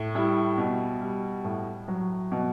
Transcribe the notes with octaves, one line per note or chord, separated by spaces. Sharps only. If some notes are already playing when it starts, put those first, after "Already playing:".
Already playing: A2
G3 E4
B2
G3
A2
F#3
B2